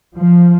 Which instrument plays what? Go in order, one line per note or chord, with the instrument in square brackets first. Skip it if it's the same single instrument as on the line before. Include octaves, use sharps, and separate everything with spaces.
[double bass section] F3